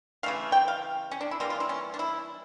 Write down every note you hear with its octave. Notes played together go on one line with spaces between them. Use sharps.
C#3 E3 A3 F5
G5
F5
C#4
D4
E4
E3 G3 A#3 F4
F4
E4
C#4
D4
E4